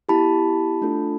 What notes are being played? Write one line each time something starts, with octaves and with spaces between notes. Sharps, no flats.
B3 E4 G4 A5 B5
A3 D4 F4 A4